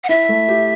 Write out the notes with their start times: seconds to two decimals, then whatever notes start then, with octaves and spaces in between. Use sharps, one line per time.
0.04 F#5
0.09 E4 E5
0.29 A3
0.49 G4